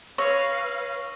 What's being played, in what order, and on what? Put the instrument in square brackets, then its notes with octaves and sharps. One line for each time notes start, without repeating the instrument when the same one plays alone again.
[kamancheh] B4 F5 [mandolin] C#5 [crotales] C#6 E6 A#6